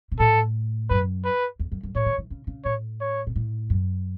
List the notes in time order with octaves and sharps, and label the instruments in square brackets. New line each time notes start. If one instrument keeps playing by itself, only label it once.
[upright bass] B2
[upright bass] A2 [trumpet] A4
[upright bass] F#2 [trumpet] B4
[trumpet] B4
[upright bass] E2
F#2
F#2
[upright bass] A2 [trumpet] C#5
[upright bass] C#3
E3
C#3
C#3
[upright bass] A2 [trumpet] C#5
[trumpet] C#5
[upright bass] B2
A2
F#2